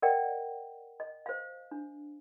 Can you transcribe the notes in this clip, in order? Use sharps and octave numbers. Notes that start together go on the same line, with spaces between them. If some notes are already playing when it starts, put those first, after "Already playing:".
A#4 D5 D#5 F#5 G5
D#5
C5 F5
D4